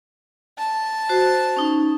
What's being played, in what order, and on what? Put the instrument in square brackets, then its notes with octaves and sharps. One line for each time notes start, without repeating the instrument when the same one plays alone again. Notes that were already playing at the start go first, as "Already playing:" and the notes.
[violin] A5
[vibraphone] F#4 C5
C#4 D#4